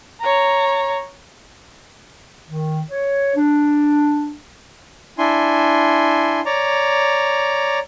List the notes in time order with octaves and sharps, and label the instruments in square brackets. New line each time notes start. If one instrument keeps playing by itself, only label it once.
[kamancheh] C#5 A#5
[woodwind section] D#3
C#5
D4
[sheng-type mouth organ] D4 E4 G#5 C6
C#5 D5 A#5